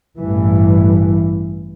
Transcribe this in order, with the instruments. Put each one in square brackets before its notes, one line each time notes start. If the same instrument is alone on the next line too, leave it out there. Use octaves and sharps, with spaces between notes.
[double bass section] A1 G2 E3